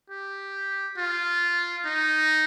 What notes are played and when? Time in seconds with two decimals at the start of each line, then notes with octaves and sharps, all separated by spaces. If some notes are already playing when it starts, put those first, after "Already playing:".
0.10 G4
0.98 F4
1.85 D#4